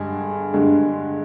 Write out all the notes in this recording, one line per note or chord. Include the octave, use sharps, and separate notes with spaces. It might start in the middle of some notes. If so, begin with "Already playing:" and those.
Already playing: G2 D3 G#3 G#4
G2 D3 G#3